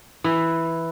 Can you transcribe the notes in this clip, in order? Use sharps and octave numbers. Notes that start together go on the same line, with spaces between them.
E3